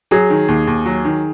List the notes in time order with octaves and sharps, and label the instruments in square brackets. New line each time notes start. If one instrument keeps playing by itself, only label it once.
[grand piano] F#3 [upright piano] G#4
[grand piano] D#3
D#2
D#2
F#3
D#3